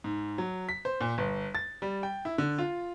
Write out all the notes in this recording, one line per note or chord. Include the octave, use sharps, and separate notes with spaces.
G#2
F#3
B6
C5
A#2
G1
A6
G3
G5
E4
D3
F4